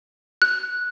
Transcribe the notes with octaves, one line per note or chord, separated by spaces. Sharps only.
F#6